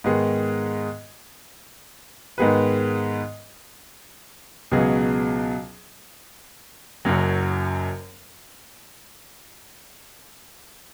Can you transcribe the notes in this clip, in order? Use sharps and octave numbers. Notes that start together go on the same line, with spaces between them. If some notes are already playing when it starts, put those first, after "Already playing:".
G#2 D#3 G#3 B3 G#4
G#2 D#3 B3 G#4 B4
C#2 B2 F#3 B3 G#4
F#1 F#2 F#3